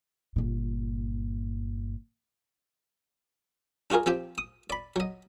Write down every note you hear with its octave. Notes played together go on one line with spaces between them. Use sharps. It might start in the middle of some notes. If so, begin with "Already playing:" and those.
G1 A#2
D4 F4 F#4 G#4 A#4
F3 C4 G4 G5
D#6
D5 B5
F#3 D#5